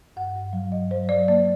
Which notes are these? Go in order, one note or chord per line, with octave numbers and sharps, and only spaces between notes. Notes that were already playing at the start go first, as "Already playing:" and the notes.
G2 F#5
G2
F#3
G2 D#5
F#3 C5
F#3 D5
A#3 D5